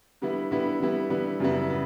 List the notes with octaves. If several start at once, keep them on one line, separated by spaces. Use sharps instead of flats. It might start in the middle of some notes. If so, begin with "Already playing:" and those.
D3 G3 B3 E4
D3 G3 B3 E4
D3 G3 B3 E4
D3 G3 B3 E4
F#2 C#3 G3 B3 E4
C#3 B3